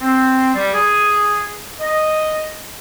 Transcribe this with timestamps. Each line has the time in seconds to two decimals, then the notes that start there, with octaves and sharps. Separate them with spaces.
0.01 C4
0.54 G3
0.73 G#4
1.80 D#5